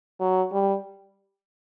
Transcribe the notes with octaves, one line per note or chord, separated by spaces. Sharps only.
F#3
G3